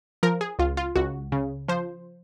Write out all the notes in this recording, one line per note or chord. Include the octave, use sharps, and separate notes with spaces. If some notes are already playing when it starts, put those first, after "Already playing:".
F3 A#4
G#4
C#2 F4
F4
C#2 F#4
C#3
F3 C5